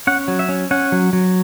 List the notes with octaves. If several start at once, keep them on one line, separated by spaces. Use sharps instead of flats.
C#4 F#5
F#3
E5
C#4
C#4 F#5
F#3
F#3